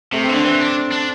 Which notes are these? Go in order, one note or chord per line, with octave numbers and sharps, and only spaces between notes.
C3 A3
C4
D3
D4
E3 C4
D4
D4